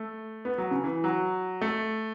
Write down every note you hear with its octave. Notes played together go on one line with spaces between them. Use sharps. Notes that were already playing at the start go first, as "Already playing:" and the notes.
Already playing: A3
B3
F#3
C#3
E3
F#3
A3